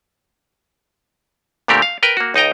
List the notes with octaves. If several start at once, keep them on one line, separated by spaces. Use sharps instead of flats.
A#2 D3 A3 C4 G4 A#4
F5
A#4 B4 G5
A#3 F#4
C#2 D#4 D#5 G5 A#5